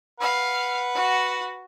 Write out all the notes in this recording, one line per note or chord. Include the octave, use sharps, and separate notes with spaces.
B4 F5 F#5
F#4